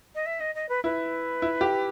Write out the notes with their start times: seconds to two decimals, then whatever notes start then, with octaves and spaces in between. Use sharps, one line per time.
0.15 D#5
0.26 E5
0.40 D#5
0.55 D#5
0.69 B4
0.84 E4 B4
1.42 E4
1.61 G4